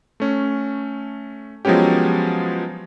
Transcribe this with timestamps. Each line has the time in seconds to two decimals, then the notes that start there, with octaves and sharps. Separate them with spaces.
0.20 A3 C#4
1.65 F3 F#3 G#3 B3 C#4 G4